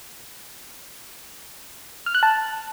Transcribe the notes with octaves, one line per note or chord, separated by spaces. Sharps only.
F6
F#6
A5